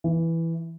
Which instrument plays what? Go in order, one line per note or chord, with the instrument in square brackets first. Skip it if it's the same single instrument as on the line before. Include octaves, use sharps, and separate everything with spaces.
[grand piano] E3